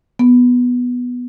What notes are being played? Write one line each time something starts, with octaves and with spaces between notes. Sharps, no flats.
B3